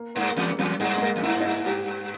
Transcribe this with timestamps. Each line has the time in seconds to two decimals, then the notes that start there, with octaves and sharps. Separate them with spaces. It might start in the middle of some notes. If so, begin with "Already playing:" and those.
Already playing: A#3
0.15 G2 A#3
0.30 A#3
0.36 E2 G#3
0.58 E2 G3
0.80 G2 G#3
0.97 G#3
1.02 A#3
1.16 E2
1.23 G2 E4
1.40 D#4
1.45 E4
1.66 G4